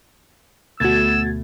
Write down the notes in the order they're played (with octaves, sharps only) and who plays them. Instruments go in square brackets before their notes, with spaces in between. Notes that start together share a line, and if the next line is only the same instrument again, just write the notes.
[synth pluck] D2 B2 A3 [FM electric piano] F#4 G#6 A6 [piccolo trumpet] E6